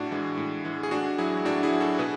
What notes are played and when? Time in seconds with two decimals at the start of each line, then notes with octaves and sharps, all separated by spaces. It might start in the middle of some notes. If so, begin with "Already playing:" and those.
Already playing: A2 D4 F#4
0.11 E3 G#3
0.37 A2
0.65 E3 G#3
0.83 G#4
0.91 A2 D4 F#4
1.18 F#3 E4 G#4
1.45 A2 D4 F#4
1.63 E4 G#4
1.72 F#3
1.80 F#4 A4
1.99 B2 G#4 B4